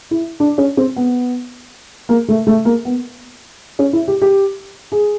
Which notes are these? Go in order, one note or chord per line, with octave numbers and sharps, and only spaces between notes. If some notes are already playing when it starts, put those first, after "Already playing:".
E4
D4
C#4
C4
B3
A#3
A3
A3
A#3
B3
C#4
E4
G4
G4
G#4